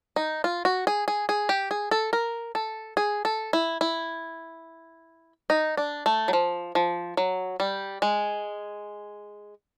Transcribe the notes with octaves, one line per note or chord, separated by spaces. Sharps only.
D#4
F4
F#4
G#4
G#4
G#4
G4
G#4
A4
A#4
A4
G#4
A4
E4
E4
D#4
D4
A3
F#3
F3
F3
F#3
G3
G#3